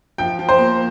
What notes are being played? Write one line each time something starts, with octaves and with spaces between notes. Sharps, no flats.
F3 G5
F3
C5
A#3